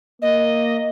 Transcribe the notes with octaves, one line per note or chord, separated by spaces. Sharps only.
A#3 D#5